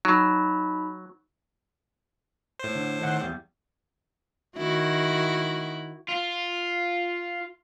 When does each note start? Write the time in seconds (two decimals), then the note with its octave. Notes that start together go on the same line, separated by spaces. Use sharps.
0.05 F#3 D#4 B5
2.59 A2 C5
2.75 D3
3.01 D#3 F#5
3.21 E2 G3
4.57 D#3 E4 F#4
6.09 F4